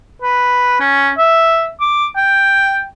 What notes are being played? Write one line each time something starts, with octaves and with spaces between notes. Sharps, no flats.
B4
C#4
E5
D6
G5